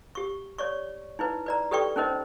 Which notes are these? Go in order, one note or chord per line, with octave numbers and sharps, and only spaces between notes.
G4 C#6
C#5 D5 C#6
D#4 E4 B4
B4 D5 A#5
G4 A4 B4 D5 G5 C#6
C#4 D#4 A#4 C5 D#5